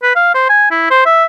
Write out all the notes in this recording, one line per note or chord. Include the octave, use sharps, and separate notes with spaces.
B4
F5
C5
G#5
E4
C5
E5